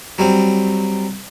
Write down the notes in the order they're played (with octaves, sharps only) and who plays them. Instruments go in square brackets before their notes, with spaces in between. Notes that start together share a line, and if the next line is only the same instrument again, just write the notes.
[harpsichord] F#3 G3 C4